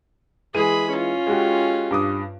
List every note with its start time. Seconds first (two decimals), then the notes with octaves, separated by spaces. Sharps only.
0.55 E3 G#3 G#4 B5 D#7
0.92 C#4 F4
1.27 G#3 F#4 G4
1.91 G2 D6 D#6